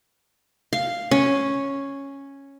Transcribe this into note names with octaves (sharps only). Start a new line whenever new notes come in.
F5
C#4